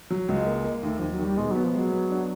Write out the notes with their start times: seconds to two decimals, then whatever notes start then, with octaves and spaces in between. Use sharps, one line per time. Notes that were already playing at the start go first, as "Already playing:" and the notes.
0.10 F#3
0.28 C#2 G#3
0.47 A#3
0.64 A#3
0.83 D#2 A3
0.99 D#2 F3
1.12 F#3
1.19 D#3 G3
1.37 B2 G#3
1.51 F#3 B3
1.64 F3
1.73 F#3 G#3
1.92 B3
2.10 D4